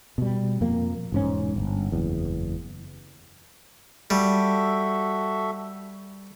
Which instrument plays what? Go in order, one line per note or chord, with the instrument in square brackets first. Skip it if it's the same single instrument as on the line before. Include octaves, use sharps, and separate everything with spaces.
[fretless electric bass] B2 G3
F2 A#2 A#3
E1 G#2 C#4
G1
F#1 E2
[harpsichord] G3 [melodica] F#4 A4 E5